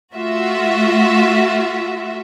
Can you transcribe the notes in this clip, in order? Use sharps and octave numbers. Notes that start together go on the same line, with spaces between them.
A3 F4 F#4 E5